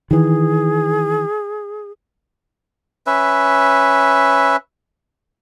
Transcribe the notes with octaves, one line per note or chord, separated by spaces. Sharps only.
D#3 E3 G#4
C#4 B4 E5